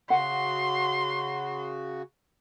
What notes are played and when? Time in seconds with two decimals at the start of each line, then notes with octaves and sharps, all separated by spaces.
0.10 C#3 F#4 F#5 C6